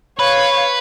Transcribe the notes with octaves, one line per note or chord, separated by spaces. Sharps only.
B4 C#5 F5